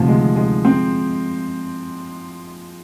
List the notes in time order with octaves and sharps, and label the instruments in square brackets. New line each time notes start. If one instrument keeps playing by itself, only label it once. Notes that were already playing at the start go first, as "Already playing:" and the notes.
Already playing: [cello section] D2 C3 D#3 [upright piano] F3
[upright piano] G#3
G#3
C4